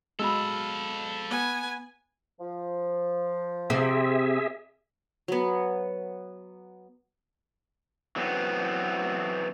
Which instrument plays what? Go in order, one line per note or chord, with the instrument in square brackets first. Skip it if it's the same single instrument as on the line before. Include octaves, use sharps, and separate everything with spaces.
[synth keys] B2 G#3 [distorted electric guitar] A4 F5 [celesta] B5 E6
[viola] B3 G#5
[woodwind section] F3
[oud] C3 C4 [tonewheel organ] G#4 E5
[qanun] F#3 B3
[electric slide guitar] E3 F#3 B3 C4